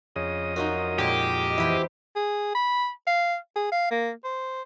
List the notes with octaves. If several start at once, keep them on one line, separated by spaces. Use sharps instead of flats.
F2 C#3 D#5
F#2 D#4 F4 F#4
A#2 G#3 G4
E2 E4 B4 C5
G#4
B5
F5
G#4
F5
A#3
C5